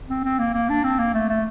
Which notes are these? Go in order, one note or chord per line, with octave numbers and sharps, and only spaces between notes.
C4
C4
A#3
A#3
D4
C4
A#3
A3
A3